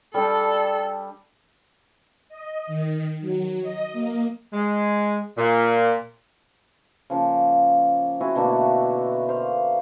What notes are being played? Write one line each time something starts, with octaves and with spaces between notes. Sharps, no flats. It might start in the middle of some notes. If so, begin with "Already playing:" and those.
G3 D4 A4
D#5
D#3
F#3
D#5
A#3
G#3
A#2
C#3 F3 A#3
C4 E4 F#4 G#4
B2 D3 A3 A#3
C5 F5